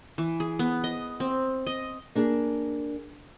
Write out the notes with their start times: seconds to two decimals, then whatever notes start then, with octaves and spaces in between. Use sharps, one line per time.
0.18 E3
0.40 G#4
0.59 B3
0.84 D#5
1.20 C4
1.67 D#5
2.15 A#3 D4 G#4